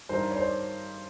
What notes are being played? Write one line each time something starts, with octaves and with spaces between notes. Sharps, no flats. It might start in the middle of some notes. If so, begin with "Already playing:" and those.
G2 D#3 A#4 C5
C#5
C5 D5